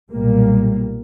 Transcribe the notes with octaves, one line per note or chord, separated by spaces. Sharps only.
B1 A#2 G3 A#3